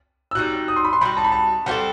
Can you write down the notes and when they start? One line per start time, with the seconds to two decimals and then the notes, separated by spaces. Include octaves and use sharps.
0.31 E6
0.35 G3 D#4 F#4 F#6
0.68 D#6
0.76 C6
0.84 B5
0.93 C6
1.01 G3 D#4 F#4 B5
1.17 A5
1.24 B5
1.32 A5
1.66 G3 C4 F#4 A4 F#5